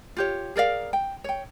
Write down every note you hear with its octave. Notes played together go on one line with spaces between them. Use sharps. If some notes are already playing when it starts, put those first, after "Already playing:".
F4 G4 C#5
G#4 A#4 D5 F5
G5
C#5 G5